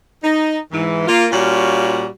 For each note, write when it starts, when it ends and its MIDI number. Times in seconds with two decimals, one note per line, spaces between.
0.23 0.58 63
0.72 1.05 44
0.72 1.05 52
1.08 1.26 58
1.08 1.26 65
1.32 2.05 46
1.32 2.05 55
1.32 2.05 61
1.32 2.05 65
1.32 2.05 66